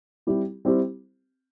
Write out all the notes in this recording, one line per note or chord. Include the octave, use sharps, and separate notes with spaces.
G3 C4 E4 G4
G3 C4 E4 G4